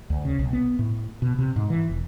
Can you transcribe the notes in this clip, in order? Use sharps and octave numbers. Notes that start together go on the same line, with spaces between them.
D2
C#3
B1
B3
A2
B2
C3
G#2
E3
E1